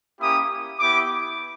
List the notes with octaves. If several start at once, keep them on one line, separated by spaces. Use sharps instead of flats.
A#3 C#4 E4 G4 D#6
B3 E4 G4 D6